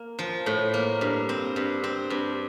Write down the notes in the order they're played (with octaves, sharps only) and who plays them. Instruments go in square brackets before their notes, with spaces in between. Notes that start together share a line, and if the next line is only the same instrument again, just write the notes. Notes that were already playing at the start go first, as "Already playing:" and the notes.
Already playing: [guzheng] A#3
F3
A2
A#3
G2
C4
G2
C4
G2